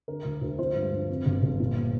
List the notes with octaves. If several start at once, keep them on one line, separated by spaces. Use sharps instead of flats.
D3 A#4
D2
D2
F3 C5
G2
G2
F2
G1
G1
A#2